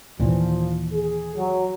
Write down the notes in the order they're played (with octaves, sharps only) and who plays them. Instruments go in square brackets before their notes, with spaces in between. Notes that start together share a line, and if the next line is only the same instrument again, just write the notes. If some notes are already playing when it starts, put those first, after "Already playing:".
[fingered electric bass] D#2 A#2 E3 [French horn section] F3
[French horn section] G#4
F#3